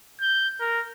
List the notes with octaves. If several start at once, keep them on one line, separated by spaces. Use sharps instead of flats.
G6
A#4